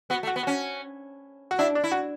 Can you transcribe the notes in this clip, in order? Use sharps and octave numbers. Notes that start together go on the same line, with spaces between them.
B3 F#4
A3
F#4
B3
C#4 F#4
F#4
D4 E4
D4
E4
F#4